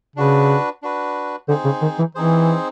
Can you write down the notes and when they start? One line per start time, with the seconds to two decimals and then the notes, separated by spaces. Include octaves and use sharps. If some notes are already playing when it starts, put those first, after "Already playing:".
0.16 C#3 D4 F#4 B4
0.83 D4 F#4 B4
1.48 D3 C4 D#4 G#4 C5
1.65 C#3
1.82 D#3
1.99 E3
2.15 E3 C4 D#4 G#4 C5